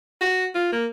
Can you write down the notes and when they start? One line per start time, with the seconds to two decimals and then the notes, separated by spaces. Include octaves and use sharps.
0.21 F#4
0.55 F4
0.72 A#3